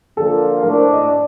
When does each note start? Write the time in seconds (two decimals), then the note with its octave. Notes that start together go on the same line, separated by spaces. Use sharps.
0.17 D3 F3 A#3 F4 A4
0.63 A2 A3 D4 A#4
0.78 C5
0.93 D#5
1.08 D5